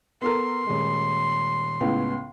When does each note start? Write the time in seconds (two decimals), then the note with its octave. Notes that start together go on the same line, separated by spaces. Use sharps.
0.22 B3 A4 A#4 C6
0.67 D#1 G#3
1.80 C#2 A2 B3